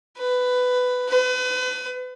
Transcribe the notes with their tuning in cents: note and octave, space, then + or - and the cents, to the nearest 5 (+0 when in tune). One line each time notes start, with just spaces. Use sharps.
B4 +15
B4 +35